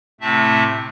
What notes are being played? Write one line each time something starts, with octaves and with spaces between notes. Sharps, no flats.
A2 C3 A3 C4 E5 A5